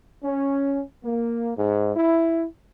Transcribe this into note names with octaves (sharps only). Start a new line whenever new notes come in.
C#4
A#3
G#2
E4